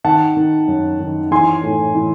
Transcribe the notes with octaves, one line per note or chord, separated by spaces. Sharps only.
D#3 F#5 A5
D#3
F#2
D#3
E3 G#5 C6
A2
E3